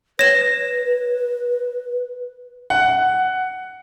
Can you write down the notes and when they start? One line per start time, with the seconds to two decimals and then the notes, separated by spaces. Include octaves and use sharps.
0.19 B4 C#5 A#6 E7
2.70 F#5